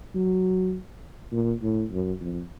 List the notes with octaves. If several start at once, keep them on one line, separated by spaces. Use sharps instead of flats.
F#3
A#2
A2
F#2
F2